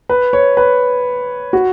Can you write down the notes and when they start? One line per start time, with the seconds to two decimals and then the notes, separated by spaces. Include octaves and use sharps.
0.09 B4
0.33 C#5
0.57 B4
1.53 F#4